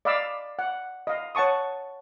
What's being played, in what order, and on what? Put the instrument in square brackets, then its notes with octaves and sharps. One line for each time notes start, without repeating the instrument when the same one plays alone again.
[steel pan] D5 D#5 F5 B5 D6 E6
F#5
D#5 F5
C#5 F#5 A5 C#6 D#6